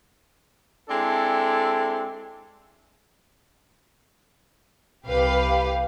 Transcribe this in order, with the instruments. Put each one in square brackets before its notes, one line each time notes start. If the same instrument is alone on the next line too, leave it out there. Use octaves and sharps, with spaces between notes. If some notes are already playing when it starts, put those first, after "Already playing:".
[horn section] G#3 C4 D4 E4 A4
[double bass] C2 [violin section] G4 B4 F5